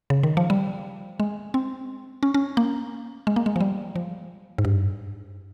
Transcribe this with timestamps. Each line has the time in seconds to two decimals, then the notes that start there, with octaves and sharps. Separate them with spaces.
0.10 C#3
0.23 D#3
0.37 F3
0.50 G3
1.20 G#3
1.54 C4
2.23 C#4
2.34 C#4
2.57 A#3
3.27 G#3
3.36 A#3
3.46 G#3
3.56 F3
3.61 G3
3.96 F3
4.58 G#2
4.65 G2